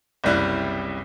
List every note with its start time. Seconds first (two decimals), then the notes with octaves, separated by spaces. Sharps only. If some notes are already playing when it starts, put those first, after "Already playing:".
0.24 F#1 C2 G3 E4 F#6